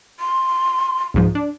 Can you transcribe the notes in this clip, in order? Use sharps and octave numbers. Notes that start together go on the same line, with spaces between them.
C6
C#2 G#2 F3
D4